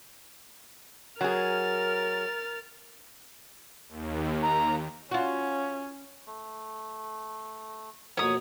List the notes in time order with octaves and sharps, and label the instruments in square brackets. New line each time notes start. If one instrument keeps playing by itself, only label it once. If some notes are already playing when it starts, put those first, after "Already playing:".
[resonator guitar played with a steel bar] F#3 G#4 [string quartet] A#4 F6 A6
[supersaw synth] D#2
[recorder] A#5
[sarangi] C#4 [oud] F4 F#4
[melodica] A3
[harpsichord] F2 B2 A#3 [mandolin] C#5 D#6